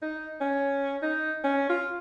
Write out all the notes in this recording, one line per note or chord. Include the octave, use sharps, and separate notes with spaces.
D#4
C#4
D#4
C#4
F4